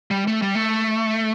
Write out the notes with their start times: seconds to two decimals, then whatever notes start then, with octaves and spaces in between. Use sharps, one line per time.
0.11 G3
0.27 A3
0.42 G3
0.55 A3